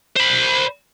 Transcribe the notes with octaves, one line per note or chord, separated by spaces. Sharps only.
C5 B5